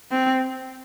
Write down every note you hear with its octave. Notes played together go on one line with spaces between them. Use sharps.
C4